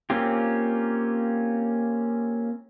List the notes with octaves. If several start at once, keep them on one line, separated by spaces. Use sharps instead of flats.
A#3 C4 C#4 F4 G4